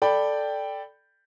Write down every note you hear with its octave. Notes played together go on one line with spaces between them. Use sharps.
A4 D5 G5 B5